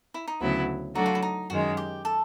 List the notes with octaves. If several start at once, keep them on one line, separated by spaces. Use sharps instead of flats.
E4
D#4
D2 C#3 F#3 B3 E4
F#3 A3 D4 D#4 F#4
F4
E4
D#4
F#2 D#3 G#3 F#4
G4
A4